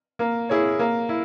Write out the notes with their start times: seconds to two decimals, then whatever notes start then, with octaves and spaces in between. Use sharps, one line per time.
0.19 A#3
0.49 E4 G#4 C#5
0.79 A#3
1.09 E4